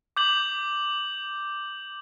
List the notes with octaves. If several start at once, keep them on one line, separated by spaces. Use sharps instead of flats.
D6 G6 F#7